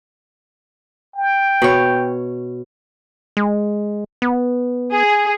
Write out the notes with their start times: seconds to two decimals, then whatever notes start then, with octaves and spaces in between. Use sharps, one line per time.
1.16 G5
1.62 B2 C#5
3.37 G#3
4.22 B3
4.92 G#4